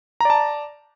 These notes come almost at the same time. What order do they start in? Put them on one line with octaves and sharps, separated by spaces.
A#5 D5 A5